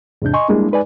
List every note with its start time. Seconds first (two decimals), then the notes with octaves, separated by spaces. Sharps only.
0.22 E2 G#2 C3 D4 G6
0.34 D#5 G#5 C6 C#6
0.49 G3 G#3 A#3 D4 E4
0.71 G#3 D#4 B4 D5 G#5